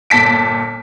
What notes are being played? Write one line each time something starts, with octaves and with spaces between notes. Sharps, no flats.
G1 A#2 A5 B6 D7